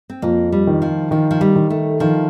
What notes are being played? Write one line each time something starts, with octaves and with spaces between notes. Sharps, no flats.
C4
F2 A#3
G3
D#3
F3
D#3 F3
F3
G3
D#3
A3
D#3 F3